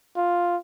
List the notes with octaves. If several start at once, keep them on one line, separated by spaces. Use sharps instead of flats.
F4